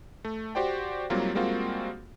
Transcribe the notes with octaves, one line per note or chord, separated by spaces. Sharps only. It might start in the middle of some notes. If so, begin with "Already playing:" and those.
A3
F#4 G4 C5 D5 G5
G#2 F#3 G3 A#3 C4 F4
G3 G#3 A#3 C4 F4 F#4